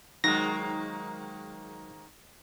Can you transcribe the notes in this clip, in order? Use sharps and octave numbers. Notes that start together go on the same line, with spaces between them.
G#2 D#3 F#3 G#3 A#3 D#4 A#6